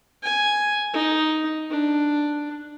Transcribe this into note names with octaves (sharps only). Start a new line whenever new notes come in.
G#5
D#4
D4